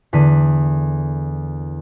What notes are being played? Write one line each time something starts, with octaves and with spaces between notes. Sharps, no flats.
E2 D3 B6 D#7